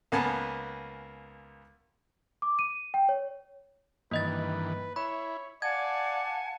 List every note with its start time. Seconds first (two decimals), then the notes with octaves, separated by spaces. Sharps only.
0.12 C#2 A#3 B3 G#5 A5
2.42 D6
2.59 D#7
2.94 G5
3.09 C#5
4.11 G2 D#3 E3 A#3 B4 D#5 A6
4.96 E4 C#5 B5
5.62 D5 F5 F#5 G#5 A5 G#6